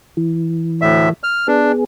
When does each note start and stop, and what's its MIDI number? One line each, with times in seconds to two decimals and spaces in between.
0.17 1.13 52
0.82 1.09 38
0.82 1.09 45
0.82 1.09 76
1.24 1.47 89
1.48 1.84 59
1.48 1.72 62
1.48 1.84 68